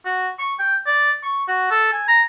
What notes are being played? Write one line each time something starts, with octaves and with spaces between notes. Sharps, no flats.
F#4
C#6
G5
D5
C#6
F#4
A4
G#5
A#5